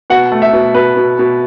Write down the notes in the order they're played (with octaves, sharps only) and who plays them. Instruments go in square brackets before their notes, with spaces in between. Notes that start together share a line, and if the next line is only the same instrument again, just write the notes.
[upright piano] B2 F#5
A3
E5
B2
B2 B4
B2
B2